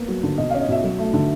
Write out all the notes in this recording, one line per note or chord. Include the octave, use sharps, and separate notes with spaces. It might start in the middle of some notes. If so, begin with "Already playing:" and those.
Already playing: A#3 B3
F#3
D3
B2 D#5
C#4 F5
D#5
B2 E5
F#3
A3
D3